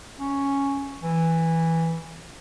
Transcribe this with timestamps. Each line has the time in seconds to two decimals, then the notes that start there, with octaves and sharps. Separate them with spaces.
0.19 C#4
1.03 E3